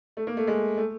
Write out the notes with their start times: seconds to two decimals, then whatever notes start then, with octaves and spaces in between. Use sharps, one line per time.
0.17 A3
0.27 A#3
0.37 A3
0.47 G#3
0.77 A3